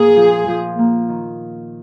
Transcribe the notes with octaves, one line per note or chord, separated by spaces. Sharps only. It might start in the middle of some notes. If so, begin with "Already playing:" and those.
Already playing: A#2 A#3 G#4
F3
F3
A#3
D#3